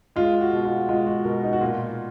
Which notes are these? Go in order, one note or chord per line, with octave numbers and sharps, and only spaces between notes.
G#3 F4
F#4
B2
F4
G#3 F4
F#4
B2 A#4
D#4
F#4
A#2 F4